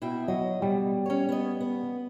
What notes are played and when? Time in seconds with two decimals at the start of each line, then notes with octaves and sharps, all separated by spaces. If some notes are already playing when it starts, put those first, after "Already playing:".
0.02 B2 E4 G5
0.28 F#3 D#5
0.62 B2 G3
1.06 C#4 C#5
1.29 B3 D#5
1.61 B3